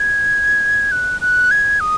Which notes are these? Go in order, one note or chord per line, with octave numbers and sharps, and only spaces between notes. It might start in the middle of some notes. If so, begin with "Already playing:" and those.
Already playing: G#6
F#6
F#6
G#6
D#6